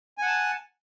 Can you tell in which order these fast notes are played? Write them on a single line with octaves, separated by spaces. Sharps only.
G#5 F#5 A5